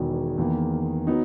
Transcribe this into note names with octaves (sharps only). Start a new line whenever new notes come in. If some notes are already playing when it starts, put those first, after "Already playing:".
Already playing: E1 E2 D#3 F#3
E2 D#3 A#3
F#3 B3 D#4